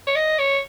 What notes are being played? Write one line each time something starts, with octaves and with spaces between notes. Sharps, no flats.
C#5
D#5
C#5